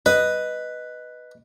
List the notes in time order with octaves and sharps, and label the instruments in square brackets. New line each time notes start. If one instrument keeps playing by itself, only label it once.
[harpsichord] B4 [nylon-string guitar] D#5